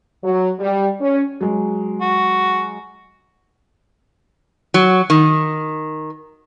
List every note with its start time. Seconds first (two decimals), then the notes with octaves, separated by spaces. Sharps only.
0.24 F#3
0.59 G3
1.01 C#4
1.41 F#3 G#3
2.01 F#4
4.74 F#3
5.10 D#3